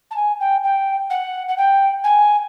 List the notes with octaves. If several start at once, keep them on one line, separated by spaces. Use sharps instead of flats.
A5
G#5
G5
G5
F#5
F#5
G5
G#5